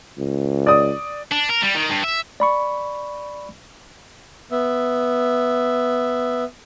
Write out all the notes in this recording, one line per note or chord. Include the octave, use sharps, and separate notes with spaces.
C#2
D5 D#6
D4
A#4
G3
D#3
G2
E5
D5 B5 C#6
B3 E5